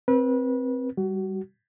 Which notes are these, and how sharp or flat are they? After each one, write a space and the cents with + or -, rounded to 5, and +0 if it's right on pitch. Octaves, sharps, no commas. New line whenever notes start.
C4 +0 B4 -30
G3 +0 F#4 +30